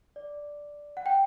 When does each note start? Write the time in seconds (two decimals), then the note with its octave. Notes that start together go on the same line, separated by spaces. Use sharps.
0.16 D5
0.97 F#5
1.06 G5